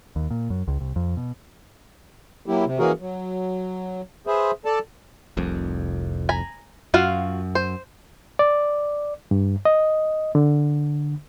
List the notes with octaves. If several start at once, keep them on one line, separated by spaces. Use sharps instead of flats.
D#2
A#2
F#2
C#2
C2
F2
B2
F#3 A#3 E4 G4
C3
E3 A#3 C#4 F#4 G#4 A#4
F#3
G#4 B4 C5 E5
A4 D5 A5
F1 C2 F2
G#5 A#5 B5
F#2 F4 F#4 F5
C5
D5
G2
D#5
D3